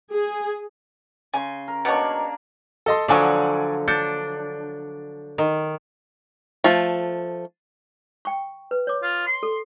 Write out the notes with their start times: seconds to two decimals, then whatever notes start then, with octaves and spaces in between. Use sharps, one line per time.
0.12 G#4
1.34 C#3 G#5 C6
1.68 A#4
1.85 B2 A#3 D4 C#5 D5
2.86 A4 D#5 C6
3.08 D3 F3 F#3 D5 G#5 C#6
3.88 D4 G6 A6 C#7
5.38 D#3
6.64 F3 A3
8.25 G5 C#6
8.71 B4
8.87 C#5 D6
9.03 F4
9.27 C6
9.43 A4